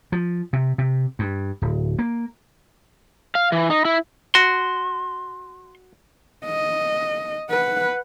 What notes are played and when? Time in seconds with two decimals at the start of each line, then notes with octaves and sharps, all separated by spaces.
0.12 F3
0.53 C3
0.78 C3
1.19 G2
1.62 D1
1.99 A#3
3.35 F5
3.52 E3
3.70 D#4
3.85 E4
4.35 F#4 C6
6.46 D#5
7.50 B4 F#5